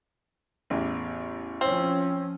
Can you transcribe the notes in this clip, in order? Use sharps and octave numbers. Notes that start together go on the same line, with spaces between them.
A1 E2
F3 C4 C#4